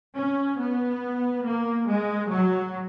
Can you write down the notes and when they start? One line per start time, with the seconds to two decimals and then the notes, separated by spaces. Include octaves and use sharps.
0.17 C#4
0.60 B3
1.46 A#3
1.89 G#3
2.31 F#3